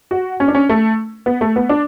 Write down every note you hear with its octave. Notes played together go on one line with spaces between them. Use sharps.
F#4
C#4
D4
C#4
A3
B3
A3
B3
D4